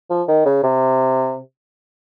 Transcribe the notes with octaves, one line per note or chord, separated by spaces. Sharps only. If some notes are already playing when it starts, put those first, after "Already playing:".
F3
D#3
C#3
C3